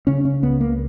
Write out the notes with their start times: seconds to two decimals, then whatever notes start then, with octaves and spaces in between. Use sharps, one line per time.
0.07 C#3 C#4
0.25 C#4
0.43 C#2 B3
0.60 A#3